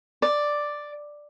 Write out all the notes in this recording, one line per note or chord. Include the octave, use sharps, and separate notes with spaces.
D5